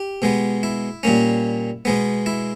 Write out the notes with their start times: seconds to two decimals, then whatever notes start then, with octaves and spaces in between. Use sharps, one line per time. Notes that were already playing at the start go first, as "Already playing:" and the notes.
Already playing: G4
0.22 B2 G#3 B3
0.63 E4
1.03 A#2 G3 A#3 C#4
1.85 B2 G#3 B3
2.26 E4